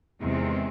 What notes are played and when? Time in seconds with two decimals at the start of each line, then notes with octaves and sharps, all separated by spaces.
0.21 E2 C3 D#3 G#3 C4